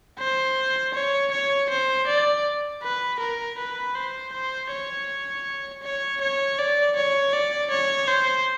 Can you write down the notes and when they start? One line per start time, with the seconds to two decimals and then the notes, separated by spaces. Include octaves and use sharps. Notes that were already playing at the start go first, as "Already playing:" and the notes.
0.19 C5
0.94 C#5
1.32 C#5
1.70 C5
2.07 D5
2.83 B4
3.20 A#4
3.58 B4
3.95 C5
4.33 C5
4.71 C#5
5.83 C#5
6.21 C#5
6.59 D5
6.96 C#5
7.33 D5
7.71 C#5
8.08 C5